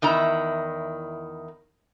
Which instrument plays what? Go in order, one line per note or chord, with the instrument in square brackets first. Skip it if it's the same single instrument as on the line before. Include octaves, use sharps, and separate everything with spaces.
[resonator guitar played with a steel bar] E2 D#3 E4 A#5